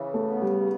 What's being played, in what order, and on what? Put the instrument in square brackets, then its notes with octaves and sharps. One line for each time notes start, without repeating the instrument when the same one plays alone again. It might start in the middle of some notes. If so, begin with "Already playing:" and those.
Already playing: [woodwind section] C#3 E3
[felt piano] A3
[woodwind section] B3
[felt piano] G3